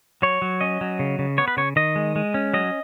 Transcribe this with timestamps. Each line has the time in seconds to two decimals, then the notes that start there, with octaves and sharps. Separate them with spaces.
0.22 F#3 C#5
0.42 F#3
0.61 C#4 D#5
0.81 F#3
0.99 C#3
1.19 C#3
1.38 B3 C#5
1.48 B4
1.57 C#3 C#5
1.76 D#3 D#5
1.96 G#3
2.16 G#3
2.34 C#4
2.54 F#3 D#5